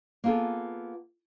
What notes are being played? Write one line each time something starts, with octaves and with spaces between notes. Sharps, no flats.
A#3 B3 F4 G#4 A4